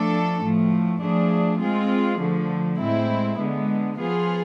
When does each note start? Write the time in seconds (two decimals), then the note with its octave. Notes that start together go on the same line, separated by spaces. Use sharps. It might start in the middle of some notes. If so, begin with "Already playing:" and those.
Already playing: F3 A3 D4 A4
0.41 A2 F3 A3
1.01 F3 A3 D4 G#4
1.60 G#3 C4 F4 G#4
2.19 D3 F3 A3
2.78 A2 G#3 C4 E4
3.38 D3 G#3 B3
3.97 F3 B3 F4 G#4